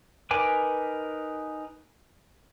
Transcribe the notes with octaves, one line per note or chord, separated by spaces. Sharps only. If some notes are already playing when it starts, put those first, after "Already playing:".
D#4 A#4 B4 G#5 D6